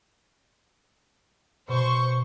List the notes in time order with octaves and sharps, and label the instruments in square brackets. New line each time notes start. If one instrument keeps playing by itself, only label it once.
[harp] B2 [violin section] C5 C#6